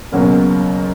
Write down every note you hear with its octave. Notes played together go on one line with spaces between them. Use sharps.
C#2 B2 F#3 A#3 C#4